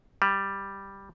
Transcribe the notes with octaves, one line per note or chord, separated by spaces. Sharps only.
G3